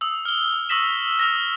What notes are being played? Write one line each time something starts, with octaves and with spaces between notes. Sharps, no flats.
D#6 E6
F6 G7
C#6 D#6 E6 A#6 B6 E7
D#6 F6 A#6